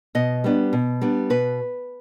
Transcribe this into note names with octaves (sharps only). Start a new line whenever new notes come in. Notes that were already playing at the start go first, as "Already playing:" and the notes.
B2 D#5
G3 B3 D4
B2
G3 B3 D4
B2 B4